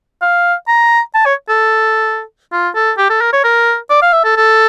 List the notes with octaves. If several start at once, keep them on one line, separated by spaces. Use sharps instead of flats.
F5
A#5
A5
C#5
A4
F4
A4
G4
A4
A#4
C#5
A#4
D5
F5
E5
A4
A4